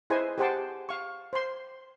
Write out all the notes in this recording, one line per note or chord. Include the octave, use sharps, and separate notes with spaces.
E4 G#4 B4 C5 D#5 G#5
G4 G#4 C5 F#5 G5 A5
F5 C#6
C5 C6